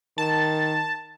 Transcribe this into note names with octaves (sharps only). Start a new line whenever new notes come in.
D#3 A5